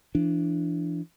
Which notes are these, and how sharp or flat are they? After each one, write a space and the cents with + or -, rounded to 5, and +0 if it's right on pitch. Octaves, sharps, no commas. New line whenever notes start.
E3 +35 D4 +0